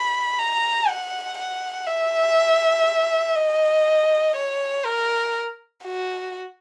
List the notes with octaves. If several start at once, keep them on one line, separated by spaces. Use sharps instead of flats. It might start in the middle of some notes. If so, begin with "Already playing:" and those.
Already playing: B5
A#5
F#5
F#5
E5
D#5
C#5
A#4
F#4